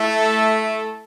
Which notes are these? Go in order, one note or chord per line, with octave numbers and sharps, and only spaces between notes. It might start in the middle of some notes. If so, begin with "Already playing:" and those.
Already playing: A3 E4 A4